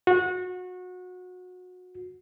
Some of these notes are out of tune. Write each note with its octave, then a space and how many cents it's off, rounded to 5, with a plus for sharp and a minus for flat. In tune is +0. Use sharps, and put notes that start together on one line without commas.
F#4 -25